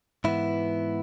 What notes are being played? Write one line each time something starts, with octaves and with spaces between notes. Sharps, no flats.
G#2 E3 B3 E4